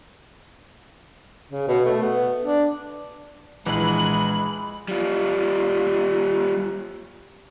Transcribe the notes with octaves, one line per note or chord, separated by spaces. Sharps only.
C#3
B2
A3
B3
D4
A#1 E3 G#3 B5 F#6
G3 F4